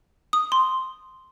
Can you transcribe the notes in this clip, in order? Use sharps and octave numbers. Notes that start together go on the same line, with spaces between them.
D#6
C6